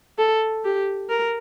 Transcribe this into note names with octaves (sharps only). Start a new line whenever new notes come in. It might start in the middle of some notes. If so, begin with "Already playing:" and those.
A4
G4
A#4